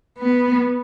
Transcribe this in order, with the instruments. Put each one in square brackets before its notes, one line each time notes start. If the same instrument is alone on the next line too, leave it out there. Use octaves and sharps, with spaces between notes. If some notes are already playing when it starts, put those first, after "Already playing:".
[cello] B3